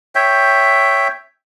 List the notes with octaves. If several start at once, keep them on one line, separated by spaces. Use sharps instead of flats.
C#5 E5 G5